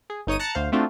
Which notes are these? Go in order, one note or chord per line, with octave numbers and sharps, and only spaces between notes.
G#4
G1 D#4 C#5 D#6 D#7
A5 A#5 F#6 A6 C#7
D2 C5 F5
A3 C4 D4 F4 F#4